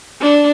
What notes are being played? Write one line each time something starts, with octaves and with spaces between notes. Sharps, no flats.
D4